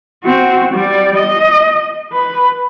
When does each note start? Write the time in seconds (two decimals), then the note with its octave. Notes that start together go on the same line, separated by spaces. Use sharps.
0.24 C4 F#4
0.73 G3 D5
1.17 D#5
2.13 B4